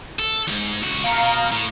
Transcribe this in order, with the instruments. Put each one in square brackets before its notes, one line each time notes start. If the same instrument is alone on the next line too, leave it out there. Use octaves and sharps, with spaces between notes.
[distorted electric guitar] A4
E2 G#2
C#2 F#4
[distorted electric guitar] B2 A3 [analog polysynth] F5 A#5
[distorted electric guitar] B2
A2